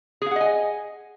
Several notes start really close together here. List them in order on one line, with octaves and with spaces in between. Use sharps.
G#4 F5 F#5 D#5 G#5